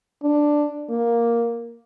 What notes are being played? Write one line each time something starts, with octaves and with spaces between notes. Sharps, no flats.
D4
A#3